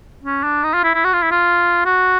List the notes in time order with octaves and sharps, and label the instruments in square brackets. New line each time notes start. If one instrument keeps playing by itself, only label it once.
[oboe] C#4
D4
D#4
F4
E4
E4
F#4
F4
E4
F4
F#4